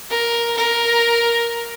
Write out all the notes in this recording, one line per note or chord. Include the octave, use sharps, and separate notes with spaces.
A#4
A#4